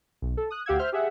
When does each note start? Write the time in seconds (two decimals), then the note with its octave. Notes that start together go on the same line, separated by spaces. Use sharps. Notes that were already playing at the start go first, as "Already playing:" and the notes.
0.22 B1
0.37 A4
0.50 D#6 F#6
0.66 D2 G4 F5 F#5 E6 G#6
0.79 C5 E5 F6 G6
0.92 G4 G#4 E5 F#5